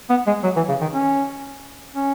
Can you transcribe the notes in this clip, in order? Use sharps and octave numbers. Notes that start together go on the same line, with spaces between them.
B3
G#3
F#3
E3
C#3
D#3
C#4
C#4